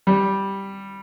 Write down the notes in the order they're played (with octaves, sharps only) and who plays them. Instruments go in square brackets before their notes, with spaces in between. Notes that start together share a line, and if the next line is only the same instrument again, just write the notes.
[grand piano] G3